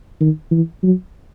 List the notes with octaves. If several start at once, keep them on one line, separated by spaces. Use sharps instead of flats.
D#3
E3
F#3